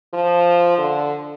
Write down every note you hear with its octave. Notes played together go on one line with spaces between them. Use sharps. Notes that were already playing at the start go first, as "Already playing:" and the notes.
F3
D3